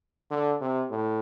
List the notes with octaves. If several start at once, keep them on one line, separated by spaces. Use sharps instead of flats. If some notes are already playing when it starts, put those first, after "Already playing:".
D3
C3
A2